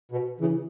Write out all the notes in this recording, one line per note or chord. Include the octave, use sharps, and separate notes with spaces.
B2
C#3 E3